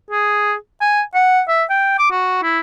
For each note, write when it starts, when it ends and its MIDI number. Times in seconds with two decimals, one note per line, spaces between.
0.11 0.54 68
0.81 1.01 80
1.15 1.41 78
1.48 1.64 76
1.70 1.97 79
1.99 2.11 86
2.11 2.39 66
2.43 2.60 64